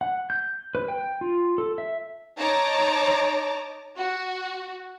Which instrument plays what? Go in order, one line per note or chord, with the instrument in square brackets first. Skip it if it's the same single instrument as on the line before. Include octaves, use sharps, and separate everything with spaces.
[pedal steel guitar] F#5
G6
B4
G5
F4
A4
E5
[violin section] D#4 C#5 A5 A#5 D6
F#4